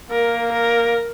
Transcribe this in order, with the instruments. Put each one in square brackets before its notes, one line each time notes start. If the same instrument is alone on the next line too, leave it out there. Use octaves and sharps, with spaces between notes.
[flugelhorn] A#3 [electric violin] A#4
[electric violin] A#4